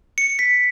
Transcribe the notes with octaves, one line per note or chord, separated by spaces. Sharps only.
C#7
B6